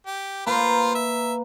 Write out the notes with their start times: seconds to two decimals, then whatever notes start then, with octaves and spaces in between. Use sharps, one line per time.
0.07 G4
0.47 A#3 F4 B4 C5 A#5
0.95 E5